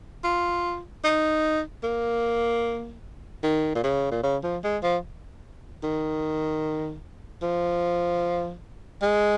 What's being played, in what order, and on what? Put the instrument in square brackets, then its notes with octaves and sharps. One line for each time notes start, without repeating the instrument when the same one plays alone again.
[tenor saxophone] F4
D#4
A#3
D#3
A#2
C#3
A#2
C#3
F3
G#3
F3
D#3
F3
G#3